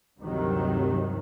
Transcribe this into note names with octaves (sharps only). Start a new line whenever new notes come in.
D2 G2 C3 D#3 F#3 G3